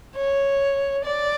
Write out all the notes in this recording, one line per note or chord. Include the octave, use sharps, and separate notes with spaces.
C#5
D5